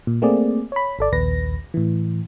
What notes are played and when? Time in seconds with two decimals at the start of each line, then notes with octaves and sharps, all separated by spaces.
0.07 A#2
0.22 A3 A#3 C4 G#4 D5
0.72 C#5 B5
0.99 G#1 A4 D5
1.12 A#1 D#2 B4 A#6
1.74 A2 E3